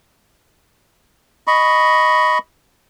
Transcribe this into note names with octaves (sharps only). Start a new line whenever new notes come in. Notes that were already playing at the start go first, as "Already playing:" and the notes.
D#5 B5 C#6